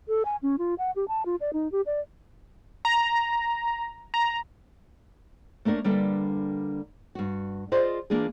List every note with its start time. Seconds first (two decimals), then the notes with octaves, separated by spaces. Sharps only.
0.08 A4
0.25 G#5
0.43 C#4
0.58 F4
0.78 F#5
0.96 G4
1.08 A5
1.26 F4
1.41 D5
1.53 D#4
1.72 G4
1.86 D5
2.85 A#5
4.14 A#5
5.65 A3 A#3 D4 A#4 C#5
5.84 D3 G3 A#3 D4 A4 B4
7.15 G2 F#4
7.72 F4 G#4 C5 D5 D#5
8.10 E3 A#3 D4 F4 G#4